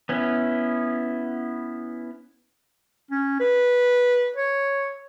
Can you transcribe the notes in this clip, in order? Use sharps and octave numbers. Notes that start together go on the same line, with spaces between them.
B3 C#4 E4
C#4
B4
C#5